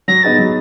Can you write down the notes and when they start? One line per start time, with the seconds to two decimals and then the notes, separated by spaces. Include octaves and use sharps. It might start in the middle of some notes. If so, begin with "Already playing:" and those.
0.08 F#3 A#6
0.23 B3 D#4 G#4 B4 A6
0.39 F#3